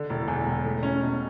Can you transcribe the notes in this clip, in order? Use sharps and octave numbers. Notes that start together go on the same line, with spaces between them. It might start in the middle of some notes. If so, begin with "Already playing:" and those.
Already playing: D3
E1
E2
E1
A3
C#4
B2